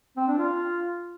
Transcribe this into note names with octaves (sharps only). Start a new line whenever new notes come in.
C4
D4
F4